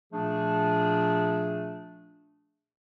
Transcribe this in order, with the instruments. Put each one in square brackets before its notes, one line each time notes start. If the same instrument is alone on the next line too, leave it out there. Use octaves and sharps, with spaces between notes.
[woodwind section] A#2 F3 A3 D4 G#4